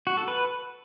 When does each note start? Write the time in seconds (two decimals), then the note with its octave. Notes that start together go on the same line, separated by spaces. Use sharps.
0.07 F#4
0.17 A4
0.28 B4